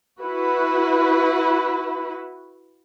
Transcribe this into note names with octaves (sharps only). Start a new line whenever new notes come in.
E4 F#4 B4